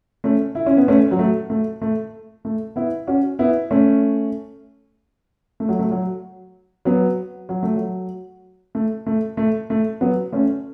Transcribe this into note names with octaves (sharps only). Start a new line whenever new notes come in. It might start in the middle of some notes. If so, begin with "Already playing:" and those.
A3 C#4
E4
C#4
B3
A3 C#4
F#3
A3
A3
A3
A3
B3 E4
C#4 F#4
B3 E4
A3 C#4
A3
F#3
A3
F#3
F#3 B3
F#3
A3
F#3
A3
A3
A3
A3
F#3 B3
A3 C#4